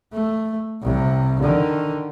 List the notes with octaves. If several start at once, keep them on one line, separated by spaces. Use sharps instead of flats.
A3
C2 C3
D3 D#3